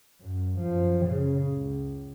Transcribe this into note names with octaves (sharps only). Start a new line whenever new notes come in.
F#2
F#2 F3
C#3
C#2